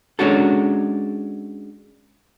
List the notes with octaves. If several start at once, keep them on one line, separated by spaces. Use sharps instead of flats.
G#3 C#4 D4 F#4 A4